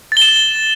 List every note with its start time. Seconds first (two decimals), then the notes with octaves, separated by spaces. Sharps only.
0.12 A6
0.17 G7
0.22 E7